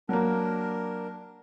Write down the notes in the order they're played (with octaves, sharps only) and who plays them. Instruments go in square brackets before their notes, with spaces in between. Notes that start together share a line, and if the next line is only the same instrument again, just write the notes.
[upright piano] F#3 A#3 [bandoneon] D4 A#4